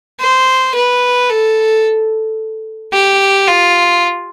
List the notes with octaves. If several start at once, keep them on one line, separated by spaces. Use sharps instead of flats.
C5
B4
A4
G4
F4